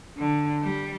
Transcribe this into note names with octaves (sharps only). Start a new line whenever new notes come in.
D3
G3